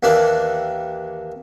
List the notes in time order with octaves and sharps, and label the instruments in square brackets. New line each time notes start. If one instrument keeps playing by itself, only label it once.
[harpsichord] D#2 E3 A#3 D4 D5